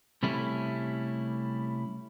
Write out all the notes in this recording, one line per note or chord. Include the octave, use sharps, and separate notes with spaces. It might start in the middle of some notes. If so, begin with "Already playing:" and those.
C3 G3 A3 C#4 E4